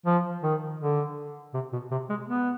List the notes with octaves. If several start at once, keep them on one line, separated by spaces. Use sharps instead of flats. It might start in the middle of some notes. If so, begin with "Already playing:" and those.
F3
D#3
D3
C3
B2
C3
G#3
B3